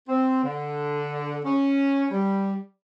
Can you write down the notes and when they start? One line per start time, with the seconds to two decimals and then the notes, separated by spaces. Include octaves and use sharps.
0.09 C4
0.44 D3
1.45 C#4
2.11 G3